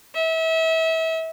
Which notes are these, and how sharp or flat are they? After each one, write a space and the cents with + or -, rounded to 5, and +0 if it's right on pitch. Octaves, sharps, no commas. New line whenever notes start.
E5 -30